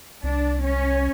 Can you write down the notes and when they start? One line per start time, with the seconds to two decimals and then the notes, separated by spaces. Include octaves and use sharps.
0.23 C2 D4
0.63 C#4